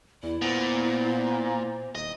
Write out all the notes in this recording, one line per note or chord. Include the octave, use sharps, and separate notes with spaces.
E2 E4 D5
A#2 B3 C5
D#1 D#5